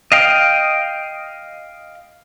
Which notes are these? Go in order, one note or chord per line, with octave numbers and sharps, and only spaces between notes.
D#5 F5 G5